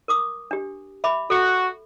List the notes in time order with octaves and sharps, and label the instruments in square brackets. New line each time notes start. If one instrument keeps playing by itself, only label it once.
[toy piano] A#4 D6 D#6
D4 G4
E5 B5 D6
[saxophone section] F#4 [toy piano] A4